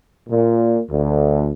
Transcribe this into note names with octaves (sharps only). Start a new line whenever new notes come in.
A#2
D2